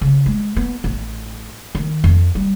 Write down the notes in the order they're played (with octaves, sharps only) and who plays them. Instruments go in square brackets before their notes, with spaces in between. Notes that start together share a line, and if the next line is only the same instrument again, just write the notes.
[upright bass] C#3
G#3
B3
A1
D#3
F2
G3